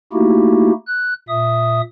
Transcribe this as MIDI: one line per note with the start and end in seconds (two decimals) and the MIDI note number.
0.13 0.72 57
0.13 0.72 58
0.13 0.72 63
0.13 0.72 64
0.13 0.72 66
0.13 0.72 67
0.87 1.14 90
1.28 1.81 46
1.28 1.81 76
1.28 1.81 87